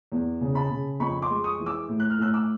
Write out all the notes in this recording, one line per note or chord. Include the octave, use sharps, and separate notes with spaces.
E2
C#3
A5 B5
C#3
F2 B5 C#6
C6 D6
G#3
C#6 D#6
E3
D6 E6
A2
F#6
F6
A2 E6 F#6
D6 E6